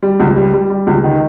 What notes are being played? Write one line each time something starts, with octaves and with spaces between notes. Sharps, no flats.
G3
C#2
G3
G3
G3
C#2
D#3